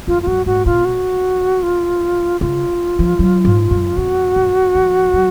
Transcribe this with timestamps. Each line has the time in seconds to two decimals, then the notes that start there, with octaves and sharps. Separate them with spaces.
0.07 F2 F4
0.22 F4
0.27 F#2 F#4
0.46 G#2 F#4
0.66 B2 F4
0.85 F#4
1.63 F4
2.41 C#3 F4
2.99 F3
3.19 F#3
3.45 G#2
3.71 F#2
3.97 F2 F#4
4.36 F#2
4.75 F3
5.13 F#3